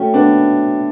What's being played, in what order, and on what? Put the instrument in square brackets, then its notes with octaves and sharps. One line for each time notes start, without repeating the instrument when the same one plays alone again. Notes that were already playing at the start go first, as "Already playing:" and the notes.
Already playing: [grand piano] A3 C#4 [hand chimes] F#4 C#5 G5
[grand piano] B3 D4